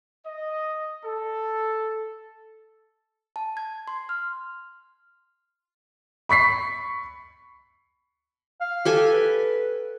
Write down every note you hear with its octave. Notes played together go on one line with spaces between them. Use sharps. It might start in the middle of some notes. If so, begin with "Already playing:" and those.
D#5
A4
A5
G#6
C6
F6
B5 C#6 B6 C7
F5
G4 A4 G#5
B4